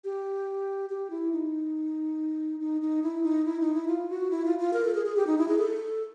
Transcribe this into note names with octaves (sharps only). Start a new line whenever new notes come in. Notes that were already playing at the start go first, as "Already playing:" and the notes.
G4
G4
E4
D#4
D#4
D#4
E4
D#4
E4
D#4
E4
F4
F#4
E4
F4
F4
A#4
A4
G#4
G#4
G4
D#4
E4
G#4
A4